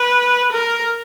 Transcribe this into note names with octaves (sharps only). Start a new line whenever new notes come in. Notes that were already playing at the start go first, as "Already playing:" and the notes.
Already playing: B4
A#4